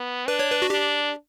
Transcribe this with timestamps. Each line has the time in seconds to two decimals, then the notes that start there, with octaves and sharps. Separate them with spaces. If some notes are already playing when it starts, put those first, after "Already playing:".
Already playing: B3
0.28 D4 B4
0.39 C#5
0.52 B4
0.62 F#4
0.69 D4 G4